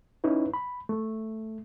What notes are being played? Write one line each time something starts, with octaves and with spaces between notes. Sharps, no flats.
C#4 D#4 E4 B4
B5
A3